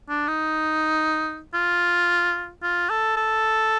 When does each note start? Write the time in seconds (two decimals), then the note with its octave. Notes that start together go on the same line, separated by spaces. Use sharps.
0.09 D4
0.28 D#4
1.54 F4
2.63 F4
2.90 A4
3.17 A4